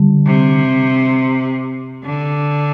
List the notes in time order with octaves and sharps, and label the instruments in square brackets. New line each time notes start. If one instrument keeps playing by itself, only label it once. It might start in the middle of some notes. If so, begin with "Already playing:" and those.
Already playing: [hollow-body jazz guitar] D3 G3
[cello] C3
D3